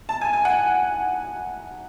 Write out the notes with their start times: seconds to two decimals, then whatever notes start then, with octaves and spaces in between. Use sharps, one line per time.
0.09 A5
0.21 G#5
0.33 G#5
0.45 F#5